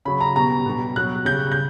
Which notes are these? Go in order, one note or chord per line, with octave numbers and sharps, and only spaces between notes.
C#3 F#3 B5
A#5
B2 G3 A#5
B2 G3
B2 F#3 F#6
C#3 G3 G6
G6